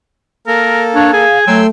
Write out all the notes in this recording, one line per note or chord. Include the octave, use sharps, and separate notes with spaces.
A#3 A4 A#4
D4 C#5 F5
G#4 G#5
F#3 A3 G5 C6 E6